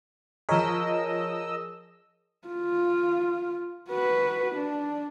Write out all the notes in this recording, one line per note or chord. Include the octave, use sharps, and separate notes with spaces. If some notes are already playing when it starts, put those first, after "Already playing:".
F3 G#4 A#4 C#5 D#5 E6 B6
F4
F#4 B4
D4